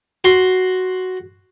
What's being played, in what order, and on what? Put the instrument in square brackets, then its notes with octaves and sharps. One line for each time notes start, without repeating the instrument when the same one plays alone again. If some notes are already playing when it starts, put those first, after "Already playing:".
[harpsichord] F#4 C6